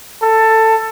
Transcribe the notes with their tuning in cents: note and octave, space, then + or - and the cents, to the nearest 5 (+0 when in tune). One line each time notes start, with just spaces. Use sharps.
A4 +15